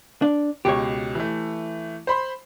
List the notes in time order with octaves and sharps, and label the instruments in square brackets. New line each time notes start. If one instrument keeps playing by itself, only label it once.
[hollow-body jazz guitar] D4
[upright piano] C#2 B2 [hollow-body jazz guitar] G4 C#5
[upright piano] E3 A3
C5 B5 C6